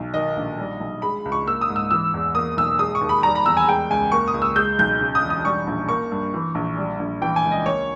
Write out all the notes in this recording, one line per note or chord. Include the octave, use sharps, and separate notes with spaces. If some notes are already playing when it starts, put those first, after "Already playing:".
Already playing: B1
D#3 D#5
A#1
G3
B1
G#3 B5
C#2
C#6
A#3 E6
D#6
G#2
E6
E3 E6
E2
A#3 D#6
B1 E6
G#3 D#6
C#6
D#2
B5
G3 A#5
B5
E2 E6
G#5
G#3 G5
C#2 G#5
A#3 C#6
D#6
C#2
E6
G#3 G6
B1 G6
C#3
D#6
E1
D#6
G3 C#6
A#1
A#3 C#6
G2
E3
A#1
G3
A#1
E3 G5
G#5
C#2
D#5
A#3 C#5